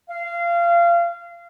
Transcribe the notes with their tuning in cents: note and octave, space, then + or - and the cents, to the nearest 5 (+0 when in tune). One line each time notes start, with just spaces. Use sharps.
F5 -25